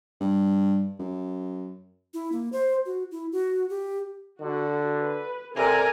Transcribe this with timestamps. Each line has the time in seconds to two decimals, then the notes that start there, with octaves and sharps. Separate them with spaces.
0.20 G2
0.99 F#2
2.14 E4
2.32 A#3
2.53 C5
2.86 F#4
3.11 E4
3.32 F#4
3.70 G4
4.39 D3 F#4
4.98 B4
5.56 C3 A4 A#4 D5 G#5